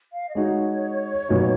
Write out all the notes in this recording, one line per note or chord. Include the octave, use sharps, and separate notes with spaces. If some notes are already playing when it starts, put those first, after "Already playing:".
F5
D#5
G#3 D#4 F#4 C#5
A#2 F#3 B3 D#4